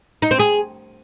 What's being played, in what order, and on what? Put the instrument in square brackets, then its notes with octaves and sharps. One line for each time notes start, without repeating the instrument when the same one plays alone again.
[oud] D#4
C4
G#4